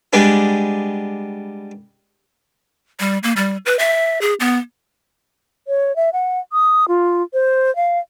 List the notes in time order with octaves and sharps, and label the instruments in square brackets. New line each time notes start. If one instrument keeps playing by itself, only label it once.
[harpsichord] G3 G#3 B3 D4
[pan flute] G3
A#3
G3
B4
E5
G#4
B3
[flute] C#5
E5
F#5
D#6
F4
C5
F5